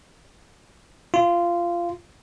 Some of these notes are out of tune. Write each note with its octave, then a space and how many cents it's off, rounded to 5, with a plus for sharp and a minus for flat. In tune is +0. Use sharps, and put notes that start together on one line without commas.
F4 -15